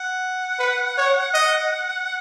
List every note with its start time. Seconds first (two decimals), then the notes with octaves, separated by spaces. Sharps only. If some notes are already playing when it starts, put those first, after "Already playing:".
Already playing: F#5
0.59 B4
0.97 C#5
1.34 D#5